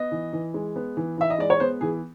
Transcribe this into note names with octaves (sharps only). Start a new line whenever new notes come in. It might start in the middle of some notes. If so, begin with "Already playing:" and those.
Already playing: B3 D#5
E3
E3
G#3
B3
E3
E3 E5
D#5
G#3 D5
C#5
B3 C5
E3 G#4